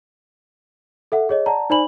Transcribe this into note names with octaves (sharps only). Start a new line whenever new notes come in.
A4 E5 F#5
G#4 C#5 D#5
D5 F#5 A5 A#5
D#4 C5 D5 G#5 B5 F#7